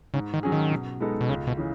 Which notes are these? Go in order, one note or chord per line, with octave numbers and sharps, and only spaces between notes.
G#2 C#3
D#3
F#3 C#4 G#4
D#3
B2
G#3 B3 D#4 A4
B2
C#2 C#3
B2
C#3 E3